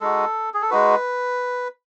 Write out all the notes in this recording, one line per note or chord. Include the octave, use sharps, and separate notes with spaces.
G#3 D#4 F#4 A4
G#4
A4
G#3 D#4 F#4 B4